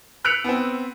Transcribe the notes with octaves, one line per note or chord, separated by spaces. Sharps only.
E6 F#6 B6 C#7 D7 F7
B3 C4